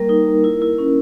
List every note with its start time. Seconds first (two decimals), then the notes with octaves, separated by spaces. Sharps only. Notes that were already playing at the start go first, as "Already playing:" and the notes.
Already playing: G3 A#3 A#4
0.09 D#4
0.27 A#3
0.44 E4
0.62 E4
0.78 C#4